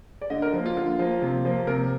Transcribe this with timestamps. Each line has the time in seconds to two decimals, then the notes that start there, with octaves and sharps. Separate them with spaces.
0.21 D5
0.30 D3 D#5
0.42 A#4
0.53 F3 A#3
0.66 F4
0.76 D3 F4
0.99 F3 A#3
1.22 C3
1.45 F3 A#3
1.67 C3 A#4